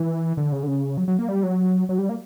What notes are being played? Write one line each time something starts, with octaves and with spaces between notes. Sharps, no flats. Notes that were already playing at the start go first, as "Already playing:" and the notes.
Already playing: E3
D3
C#3
D3
C#3
F#3
F#3
A#3
G3
F#3
F#3
G3
A#3